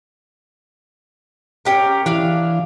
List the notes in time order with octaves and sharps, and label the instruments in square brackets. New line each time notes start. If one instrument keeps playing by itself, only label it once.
[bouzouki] C#4 G4 A#4
[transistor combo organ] E3 [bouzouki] D4 F5